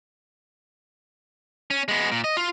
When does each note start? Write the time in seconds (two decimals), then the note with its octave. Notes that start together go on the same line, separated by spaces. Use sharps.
1.71 C#4
1.88 G#3 B3
2.12 A#2
2.24 D#5
2.37 F4